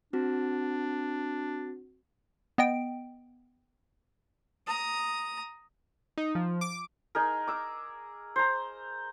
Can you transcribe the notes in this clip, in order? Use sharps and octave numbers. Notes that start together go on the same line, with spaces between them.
C4 D4 F#4
B3 D#5 G5 D7
A#5 D#6
D#4
F3
D6
D#4 G#4 A#4
D6 E6
C5 A#5